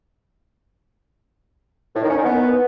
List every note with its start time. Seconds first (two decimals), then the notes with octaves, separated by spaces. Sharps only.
1.96 A2
2.03 D#3
2.10 C#4
2.18 D#3
2.25 B3